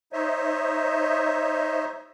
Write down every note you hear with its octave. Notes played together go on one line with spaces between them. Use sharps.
D#4 C5 C#5 D#5 E5